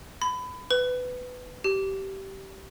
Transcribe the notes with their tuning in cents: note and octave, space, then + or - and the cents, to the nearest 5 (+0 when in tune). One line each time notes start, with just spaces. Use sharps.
B5 +25
B4 +15
G4 -20